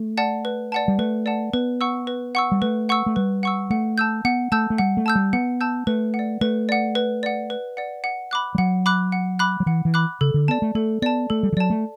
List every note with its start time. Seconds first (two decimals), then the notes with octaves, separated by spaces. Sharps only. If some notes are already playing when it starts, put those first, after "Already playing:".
Already playing: A3
0.17 D5 F#5 A5
0.45 B4
0.72 D5 F#5 A5
0.88 G3
0.99 A3 B4
1.26 D5 F#5 A5
1.53 B3 B4
1.81 F#5 C#6 E6
2.07 B4
2.35 F#5 C#6 E6
2.52 G3
2.62 A3 B4
2.89 F#5 C#6 E6
3.06 A3
3.16 G3 B4
3.43 F#5 C#6 E6
3.70 A3 F#5
3.98 A5 E6 G6
4.25 B3 F#5
4.52 A3 A5 E6 G6
4.70 A3
4.78 G3 F#5
4.97 A3
5.06 A5 E6 G6
5.15 G3
5.33 B3 F#5
5.61 A5 E6 G6
5.87 A3 B4
6.14 F#5
6.19 D5
6.41 A3 B4
6.69 D5 F#5
6.95 B4
7.23 D5 F#5
7.50 B4
7.77 D5 F#5
8.04 F#5
8.31 B5 D6 F#6
8.55 G3
8.58 F#3 F#5
8.86 B5 D6 F#6
9.12 F#5
9.39 B5 D6 F#6
9.60 F#3
9.66 E3 F#5
9.85 E3
9.94 B5 D6 F#6
10.21 C#3 A4
10.34 D3
10.48 B3 D5 A5
10.62 A3
10.75 A3 A4
11.02 B3 D5 A5
11.30 A3 A4
11.43 G3
11.52 E3
11.57 F#3 D5 A5
11.70 A3